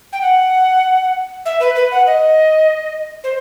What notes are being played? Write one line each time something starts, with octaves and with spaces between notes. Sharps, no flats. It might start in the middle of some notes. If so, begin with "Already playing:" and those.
G5
F#5
E5
B4
B4
F#5
D#5
C5